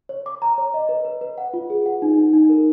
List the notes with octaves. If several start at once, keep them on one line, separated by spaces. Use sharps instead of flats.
C#5
D6
A#5
C#5
D#5
B4
B4
B4
F#5
F4
G#4
F#5
D#4
D#4
D#4
A#4